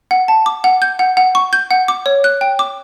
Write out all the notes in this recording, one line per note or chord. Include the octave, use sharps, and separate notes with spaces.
F#5
A5
D6
F#5
G6
F#5
F#5
C#6
G6
F#5
D6
C#5
F#6
G5
D6